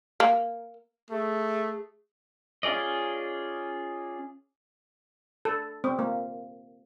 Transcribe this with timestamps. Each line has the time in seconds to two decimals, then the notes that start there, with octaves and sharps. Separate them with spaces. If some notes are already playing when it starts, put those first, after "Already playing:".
0.20 A#3
1.10 A3 G#4
2.63 C#4 F4 G#4 D5 D#5
5.45 A4
5.84 C4
5.99 A#3